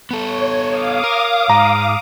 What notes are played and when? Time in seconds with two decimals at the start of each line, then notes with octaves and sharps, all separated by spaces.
0.11 B3 A4 C#5
0.67 F5 D6 D#6
1.04 A#4
1.50 G#2 A#5